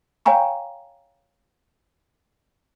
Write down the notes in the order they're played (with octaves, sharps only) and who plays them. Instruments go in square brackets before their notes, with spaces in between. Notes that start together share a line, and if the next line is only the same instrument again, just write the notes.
[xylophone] C#5 F5 G5 G#5 A#5 C#6